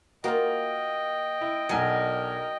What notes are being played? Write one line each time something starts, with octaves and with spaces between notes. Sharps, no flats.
A#3 F4 F#4 A#4 D#5 G5
E4
B1 F#3 D4 A#4 G#5 D#7